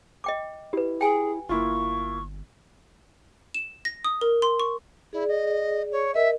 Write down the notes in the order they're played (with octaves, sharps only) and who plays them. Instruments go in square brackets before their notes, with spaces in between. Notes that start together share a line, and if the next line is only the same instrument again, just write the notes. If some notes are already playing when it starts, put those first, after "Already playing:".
[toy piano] D#5 G5 D6
[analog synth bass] E4 [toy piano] G4 B4
[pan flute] G#4 [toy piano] G5 G#5
[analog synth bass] G1 [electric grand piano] A#3 E4 F4 [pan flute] C#6
[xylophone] E7
A#6
D#6
A#4
C6
C#6
[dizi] E4 [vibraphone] G#4 D5
[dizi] D#5
C#5
[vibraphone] A#4 D#5 [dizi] E5